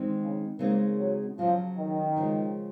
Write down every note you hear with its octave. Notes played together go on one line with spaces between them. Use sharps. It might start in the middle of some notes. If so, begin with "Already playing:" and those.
Already playing: D#3 G#3 C4 D#4
C#3
C#3 G#3 A#3 C4 D#4
F#3
C#3 F3 F#3 C#4
D#3
C#3 F3 G#3